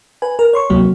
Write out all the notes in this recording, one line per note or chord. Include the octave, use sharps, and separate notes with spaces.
B4 G#5
A#4
C#5 C6 C#6
D2 C3 F#3 A#3